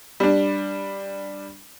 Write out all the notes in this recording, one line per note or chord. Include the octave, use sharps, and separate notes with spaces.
G3 D4